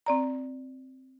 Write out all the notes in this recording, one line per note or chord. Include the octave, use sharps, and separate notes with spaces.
C4 D5 A#5